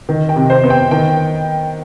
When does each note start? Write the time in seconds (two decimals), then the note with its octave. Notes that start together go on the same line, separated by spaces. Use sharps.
0.09 D#3
0.29 G5
0.36 C3
0.50 C5
0.64 B3
0.70 G5
0.91 D#3 G5